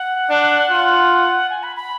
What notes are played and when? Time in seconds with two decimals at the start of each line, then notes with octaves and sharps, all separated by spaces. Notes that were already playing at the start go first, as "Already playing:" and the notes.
Already playing: F#5
0.30 D4
0.70 F4
1.50 G#5
1.63 B5
1.76 B5